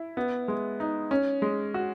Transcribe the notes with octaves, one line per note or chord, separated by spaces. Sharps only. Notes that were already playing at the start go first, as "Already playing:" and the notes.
Already playing: E4
B3
G#3
D#4
C#4
G#3
F#4